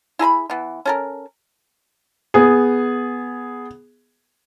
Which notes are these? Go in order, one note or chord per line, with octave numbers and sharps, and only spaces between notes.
E4 G#4 A#5 B5
E3 B3
C#4 A4 A#4
B3 G#4